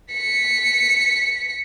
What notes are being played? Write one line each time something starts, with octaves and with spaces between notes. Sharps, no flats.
B6 C#7